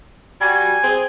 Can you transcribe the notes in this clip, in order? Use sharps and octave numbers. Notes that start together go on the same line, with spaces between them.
G3 F#4 G#5
C4 G#4